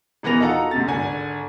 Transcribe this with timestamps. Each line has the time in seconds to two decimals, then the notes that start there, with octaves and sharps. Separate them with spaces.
0.23 D#1 E3 B3 A#4 A#6 F7
0.40 D#4 F4 F#4 A4 F#5 A#5
0.71 D2 C3 A6
0.88 G#1 D3 G#5